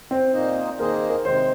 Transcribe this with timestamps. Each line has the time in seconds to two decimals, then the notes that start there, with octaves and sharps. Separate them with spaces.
0.11 C4
0.33 A#2 A#3 D#4 C5 D#5
0.79 D#3 A#3 G#4 A#4 C5 D#5
1.09 A#4
1.25 C3 D#3 G#3 C5